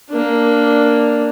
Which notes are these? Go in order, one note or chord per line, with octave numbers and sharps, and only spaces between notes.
A#3 D4